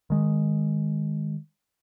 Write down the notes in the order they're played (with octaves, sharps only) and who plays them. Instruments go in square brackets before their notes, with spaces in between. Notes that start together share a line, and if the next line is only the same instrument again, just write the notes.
[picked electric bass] D#3 G#3